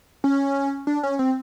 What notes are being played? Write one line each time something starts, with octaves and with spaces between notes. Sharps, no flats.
C#4
D4
C#4
C4